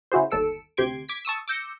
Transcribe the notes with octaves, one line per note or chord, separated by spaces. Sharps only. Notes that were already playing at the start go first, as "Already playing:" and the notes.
C#3 E4 F#4 G#4 C5
G1 D#2 A4 E6 C#7 D7
D2 C3 G4 C6 G#6 D7
D6 G#6 B6
A5 C#6 D#6 E6
D6 E6 G6 A#6 C#7